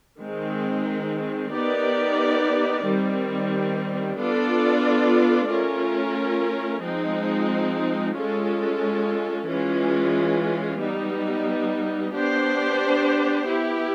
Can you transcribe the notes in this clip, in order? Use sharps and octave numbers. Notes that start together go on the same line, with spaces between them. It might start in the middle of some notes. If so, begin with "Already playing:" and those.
D#3 G#3 C4
B3 D#4 G4 A#4 D5
D#3 G3 C4
B3 D4 F4 A4 D5
A3 C#4 F4 A#4
F3 G#3 C4 D#4
G#3 C#4 F4 A4
E3 G#3 C#4 F4
G3 B3 D#4
B3 D4 G4 C5
B3 E4 G4